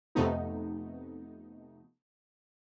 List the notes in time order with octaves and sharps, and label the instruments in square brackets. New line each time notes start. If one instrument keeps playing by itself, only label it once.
[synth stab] F2 C3 A3 B3 D#4